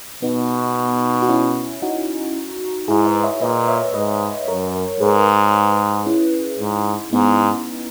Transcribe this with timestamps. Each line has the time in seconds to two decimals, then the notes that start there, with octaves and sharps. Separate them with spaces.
0.22 B2 B3 D#4
1.22 F#4
1.28 C#4 E4
1.82 D#4 F#4
2.88 G#2 E4 G#4
3.06 B4 D#5
3.23 C#5 E5
3.41 A#2 B4 D#5
3.68 C#5 E5
3.94 G#2 B4 D#5
4.47 F#2 A#4 C#5
5.00 G#2 G#4 B4
6.06 C#4 E4
6.59 G#2
7.13 G#2 B3 D#4